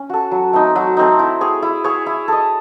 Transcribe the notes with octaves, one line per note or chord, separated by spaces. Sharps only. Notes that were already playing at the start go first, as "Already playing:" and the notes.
Already playing: C#4
F#4 A4
F#3
A3 C4 D#4
F#3
A3 C4 D#4
E4
G#4 C#5
E4
G#4 C#5
E4
A4 D#5